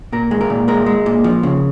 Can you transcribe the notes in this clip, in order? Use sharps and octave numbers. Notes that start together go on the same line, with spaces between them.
A#2 A#4
G#3
A#4
A#2
G#3 A#4
G#3
A#2
F3
C#3